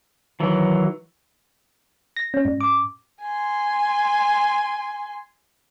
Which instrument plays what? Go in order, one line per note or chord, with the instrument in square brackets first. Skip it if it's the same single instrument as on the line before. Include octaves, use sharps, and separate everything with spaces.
[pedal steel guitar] D#3 E3 F#3
[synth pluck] A#6
C#4
G#2
D6
[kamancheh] G#5 C6